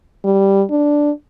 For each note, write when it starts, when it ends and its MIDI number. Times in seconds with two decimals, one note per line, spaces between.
0.25 0.63 55
0.70 1.11 62